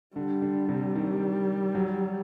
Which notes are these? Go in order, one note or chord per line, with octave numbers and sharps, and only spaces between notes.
D3 G3
D3
C3
D#3
F#3